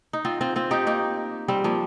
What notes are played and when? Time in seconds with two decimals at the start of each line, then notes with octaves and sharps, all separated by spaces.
0.13 D#4
0.25 C4 F4
0.41 C4 F4
0.56 C4 F4
0.71 D#4 G4
0.87 A#3 D#4
1.48 G3 C4
1.64 F3 A#3